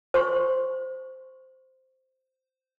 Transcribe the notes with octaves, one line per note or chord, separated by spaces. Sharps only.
C5 C6 C#6